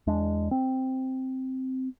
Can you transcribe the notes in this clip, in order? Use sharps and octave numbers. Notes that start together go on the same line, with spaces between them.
E2 G#3 D4
C4